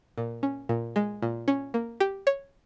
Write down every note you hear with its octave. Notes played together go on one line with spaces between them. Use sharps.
A#2
C#4
A#2
G#3
A#2
C#4
A#3
G4
C#5